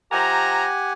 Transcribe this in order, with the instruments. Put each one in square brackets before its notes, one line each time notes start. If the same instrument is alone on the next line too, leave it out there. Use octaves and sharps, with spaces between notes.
[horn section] F3 E5 A#5 [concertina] G4 F#5 G#5